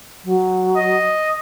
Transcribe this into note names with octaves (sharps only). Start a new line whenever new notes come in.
F#3
D#5